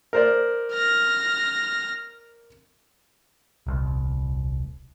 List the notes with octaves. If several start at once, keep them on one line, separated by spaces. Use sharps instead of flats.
A#4 C5 D5
F6 A#6
D#1 C2